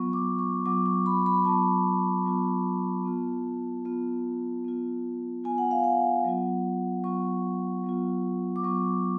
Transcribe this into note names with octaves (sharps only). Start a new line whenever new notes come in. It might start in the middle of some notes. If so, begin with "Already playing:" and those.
Already playing: F#3 B3 F4 C#6
D6
C#6
F#3 B3 F4 D6
C#6
B5
B5
F#3 B3 F4 A5
F#3 B3 F4
B3 F4
B3 F4
B3 F4
B3 F4 G#5
F#5
F5
F#5
F#3 B3 F4
F#3 B3 F4 C#6
F#3 B3 F4
D6
F#3 B3 F4 C#6